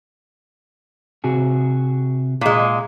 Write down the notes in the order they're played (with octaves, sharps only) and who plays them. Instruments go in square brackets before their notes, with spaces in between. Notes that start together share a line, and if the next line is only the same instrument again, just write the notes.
[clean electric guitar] C3 F#4 G#4
[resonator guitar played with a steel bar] A#2 G#3